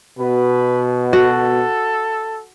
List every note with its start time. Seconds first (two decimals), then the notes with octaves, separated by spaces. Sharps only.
0.19 B2 B4
1.13 F#4 A4